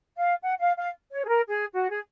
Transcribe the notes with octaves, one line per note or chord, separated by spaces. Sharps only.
F5
F#5
F5
F5
C#5
G#4
A#4
G#4
F#4
G#4